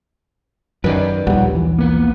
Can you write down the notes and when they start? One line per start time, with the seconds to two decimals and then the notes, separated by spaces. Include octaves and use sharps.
0.84 F#2 D#3 B4 D5
1.27 A#1 D#2 G3 F#5
1.55 E3
1.79 A#3 B3